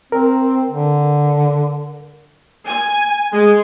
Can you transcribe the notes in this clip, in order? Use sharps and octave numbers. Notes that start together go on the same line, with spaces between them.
C4 A#4
D3
G#5
G#3